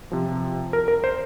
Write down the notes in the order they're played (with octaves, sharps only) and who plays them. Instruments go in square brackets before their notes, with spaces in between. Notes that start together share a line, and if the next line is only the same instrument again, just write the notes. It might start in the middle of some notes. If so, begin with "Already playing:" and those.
[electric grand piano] C3 F3
A#4
A#4
C5